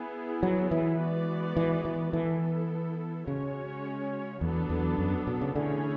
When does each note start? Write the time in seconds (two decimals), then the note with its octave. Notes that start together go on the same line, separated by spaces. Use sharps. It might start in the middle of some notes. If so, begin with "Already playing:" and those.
Already playing: B3 E4 G#4
0.43 F#3
0.71 E3
0.99 G#3 B3 F#4 B4 D5
1.57 E3
1.85 E3
2.13 E3 B3 E4 A4
3.27 C#3 G#3 C#4 F#4 C#5
4.41 E2 F#3 B3 D4 A4
4.69 E2
4.99 F#2
5.27 B2
5.41 C#3
5.55 D3 E3 A3 C#4 G#4 C#5